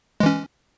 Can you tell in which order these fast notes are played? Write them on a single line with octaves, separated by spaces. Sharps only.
G#3 E3 C#4